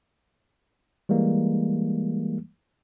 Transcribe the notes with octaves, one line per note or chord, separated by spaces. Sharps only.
E3 G3 G#3 A#3